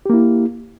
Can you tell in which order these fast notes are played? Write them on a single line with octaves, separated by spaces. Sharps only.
G4 A#3 E4